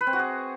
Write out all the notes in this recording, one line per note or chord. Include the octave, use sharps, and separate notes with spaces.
B4
C4
F#4
G#4